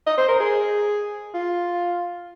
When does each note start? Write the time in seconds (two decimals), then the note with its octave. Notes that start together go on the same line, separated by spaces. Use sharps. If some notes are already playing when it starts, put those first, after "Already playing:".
0.07 D#5
0.17 C5
0.28 A#4
0.40 G#4
1.34 F4